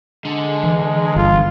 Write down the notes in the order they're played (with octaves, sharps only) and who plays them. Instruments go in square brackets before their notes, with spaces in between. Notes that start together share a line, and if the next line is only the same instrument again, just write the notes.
[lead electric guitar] D3 [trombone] G#3
[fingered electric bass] E3
[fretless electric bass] G1 [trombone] F4